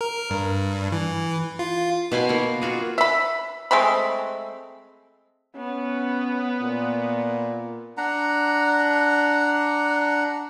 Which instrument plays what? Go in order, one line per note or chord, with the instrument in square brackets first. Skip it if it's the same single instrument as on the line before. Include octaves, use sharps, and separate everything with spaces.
[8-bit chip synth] A#4
G2
E3
F4
[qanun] B2 B4 G#5 C6
A#3 B3
F4 F#4 G#4
[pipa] E5 B5
G#3 A3 C4 B5
[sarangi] B3 [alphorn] C#4
[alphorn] A#2
[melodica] D4 F#5 A#5